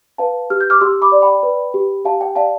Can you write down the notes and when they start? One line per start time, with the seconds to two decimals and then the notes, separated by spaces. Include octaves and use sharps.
0.18 B4 F5 A5
0.50 G4 F6
0.61 G6
0.70 D6 F6
0.81 G4 C6 E6
1.02 B5 D6
1.12 D5
1.22 G5 B5
1.43 B4
1.74 G4
2.05 G4 F5 A5
2.21 G5
2.36 D5 F5 A5